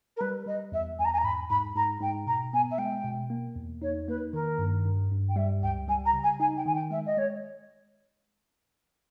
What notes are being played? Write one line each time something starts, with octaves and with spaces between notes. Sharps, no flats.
A#4
G3 B4
G3 D#5
E2 E5
E2 G#5
A#5
G#5
A#5
G#2 B5
G#2 B5
G#2 A#5
G#2 G5
B2 A#5
B3 G#5
E5
G#3 G5
B2
A#3
E2
D#4 C#5
A#3 B4
D#3 A#4
G2
G2
G2
G5
G3 E5
C#2 G5
G3 G#5
A#5
C#3
G#5
D#4 G#5
G5
D#3 G#5
G5
G#3 E5
D#5
G#3 C#5